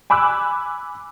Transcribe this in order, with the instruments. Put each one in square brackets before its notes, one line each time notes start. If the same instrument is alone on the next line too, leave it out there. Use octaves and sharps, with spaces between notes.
[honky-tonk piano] G#5 B5 D6 E6 F#6